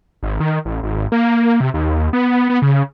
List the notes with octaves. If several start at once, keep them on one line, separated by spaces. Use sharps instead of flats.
G#1
D#3
A1
G#1
A#3
C3
D#2
B3
B3
C#3